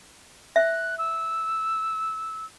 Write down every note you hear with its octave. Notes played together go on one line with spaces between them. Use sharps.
E5 F#6
E6